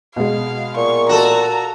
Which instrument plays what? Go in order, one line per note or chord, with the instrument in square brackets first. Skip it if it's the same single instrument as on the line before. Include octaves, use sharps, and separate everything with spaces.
[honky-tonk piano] B2 G#3 [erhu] F5
[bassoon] A#2 [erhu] C#6
[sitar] F#4 A4 [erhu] A#5